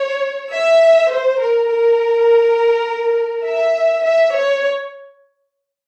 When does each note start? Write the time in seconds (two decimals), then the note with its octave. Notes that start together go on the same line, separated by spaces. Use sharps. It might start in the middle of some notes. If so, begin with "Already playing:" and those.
Already playing: C#5
0.52 E5
1.11 C5
1.40 A#4
1.70 A#4
3.45 E5
4.04 E5
4.34 C#5